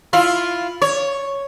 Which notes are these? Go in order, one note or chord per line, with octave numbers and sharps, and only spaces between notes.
E4 F4
C#5